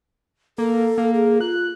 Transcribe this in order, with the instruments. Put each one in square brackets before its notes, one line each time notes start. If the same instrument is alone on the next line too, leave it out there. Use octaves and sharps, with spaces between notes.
[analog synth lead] A#3 [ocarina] A4
[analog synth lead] A#3
[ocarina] G#4
[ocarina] F4 [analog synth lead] F#6